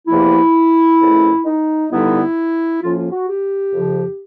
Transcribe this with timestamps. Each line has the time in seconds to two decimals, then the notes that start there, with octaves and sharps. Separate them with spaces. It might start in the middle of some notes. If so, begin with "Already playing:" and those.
0.07 E2 C3 F3 A#3 E4
0.99 F2 C#3 E3 A3 C#4
1.44 D#4
1.90 G2 D3 G3 B3 D#4 E4
2.81 A2 F3 A#3 C#4 F4
2.97 F4
3.12 F#4
3.27 G4
3.73 F2 C#3 F3